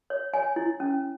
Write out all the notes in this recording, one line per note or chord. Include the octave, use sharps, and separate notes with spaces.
C#5
C#5 G#5
E4
C#4